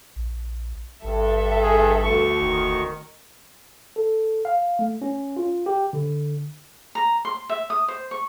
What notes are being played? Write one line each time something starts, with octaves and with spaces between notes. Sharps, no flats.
A#1
G#1 G2 A4 E5
G#4
D2 C#6
F1 D#3
A4
F5
A3
C#4
F4
G4
D3
A#5
C6
E5
D#6
C5
C#6